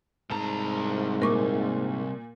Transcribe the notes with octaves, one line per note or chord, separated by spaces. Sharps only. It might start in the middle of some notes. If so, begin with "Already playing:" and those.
C2 G#2 A5 A#5
A#2 A#4 C#6 D6